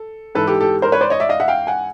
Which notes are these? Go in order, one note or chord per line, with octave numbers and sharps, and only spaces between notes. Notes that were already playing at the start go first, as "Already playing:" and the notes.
Already playing: A4
G#2 E3 A4 B4
G4 A4
G4 A4
A#4 C5
B4 C#5
C5 D5
C#5 D#5
D5 E5
D#5 F5
E5 F#5
F5 G5
F#5 G#5